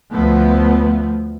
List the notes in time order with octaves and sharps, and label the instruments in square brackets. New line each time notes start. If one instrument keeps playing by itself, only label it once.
[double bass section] D2 F3 A3 B3